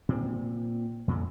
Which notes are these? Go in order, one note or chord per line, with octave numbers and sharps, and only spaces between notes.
A#2 C4
F2 A#2 D3